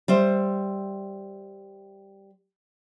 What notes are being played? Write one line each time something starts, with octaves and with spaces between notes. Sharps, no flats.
G3 C5 E5